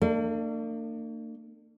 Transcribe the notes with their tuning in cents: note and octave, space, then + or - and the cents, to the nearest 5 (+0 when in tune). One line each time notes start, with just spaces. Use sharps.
A#3 -40 D4 +35